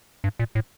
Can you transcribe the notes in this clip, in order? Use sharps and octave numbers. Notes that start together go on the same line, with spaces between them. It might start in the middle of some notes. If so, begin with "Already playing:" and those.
G2
A#2
A2